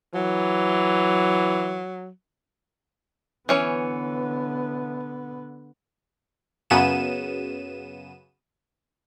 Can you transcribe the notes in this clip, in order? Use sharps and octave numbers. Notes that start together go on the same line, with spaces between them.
E3 F#3
D3 E3 B3 C#4 C#5
F#2 C#3 F#3 B3 D#7 E7